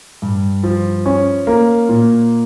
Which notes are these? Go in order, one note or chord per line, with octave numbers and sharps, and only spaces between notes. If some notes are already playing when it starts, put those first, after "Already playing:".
G2
F3
C#4
A#3
A#2